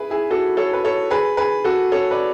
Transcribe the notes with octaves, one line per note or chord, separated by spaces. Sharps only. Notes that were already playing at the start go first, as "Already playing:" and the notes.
Already playing: E4 G#4 B4
E4 G#4
F#4 A4
A4 C#5
B4
A4 C#5
G#4 B4
G#4 B4
F#4 A4
A4 C#5
B4 D5